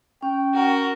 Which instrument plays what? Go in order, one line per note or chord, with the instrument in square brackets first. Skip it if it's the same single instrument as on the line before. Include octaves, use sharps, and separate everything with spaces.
[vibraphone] C#4 [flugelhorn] G5
[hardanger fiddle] F#4 A#4